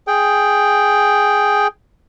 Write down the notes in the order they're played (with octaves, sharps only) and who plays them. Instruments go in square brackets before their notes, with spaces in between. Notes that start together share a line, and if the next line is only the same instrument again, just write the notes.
[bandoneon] G#4 G5